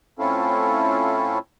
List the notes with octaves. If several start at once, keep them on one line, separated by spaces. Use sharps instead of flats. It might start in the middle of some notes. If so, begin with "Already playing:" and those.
A2 C4 C#4 E4 F4 A4